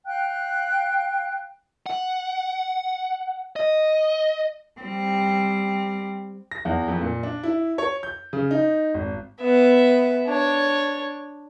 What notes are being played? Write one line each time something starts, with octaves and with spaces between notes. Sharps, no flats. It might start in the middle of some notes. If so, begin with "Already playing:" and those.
F5 G5 F#6
F#5
D#5
G3 C4
A#6
E2
F2
A#2
D4
E4
C#5
G6
C#3
D#4
G#1
B3 E5
D4 C#5